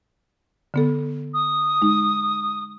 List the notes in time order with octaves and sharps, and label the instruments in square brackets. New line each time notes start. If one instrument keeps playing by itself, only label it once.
[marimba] D3 B3 A4
[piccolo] D#6
[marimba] G#3 D#4